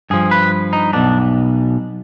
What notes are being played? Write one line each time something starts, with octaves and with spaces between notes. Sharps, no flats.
G2 F3 G#4
B4
D#4
B1 B2 D4